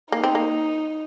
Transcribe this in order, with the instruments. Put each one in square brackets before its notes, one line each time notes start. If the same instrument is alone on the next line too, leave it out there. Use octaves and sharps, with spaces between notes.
[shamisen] A#3 [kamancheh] D#4
[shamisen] C4
A#3